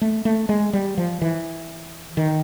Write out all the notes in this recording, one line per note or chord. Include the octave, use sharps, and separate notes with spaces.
A3
A3
G#3
G3
F3
E3
D#3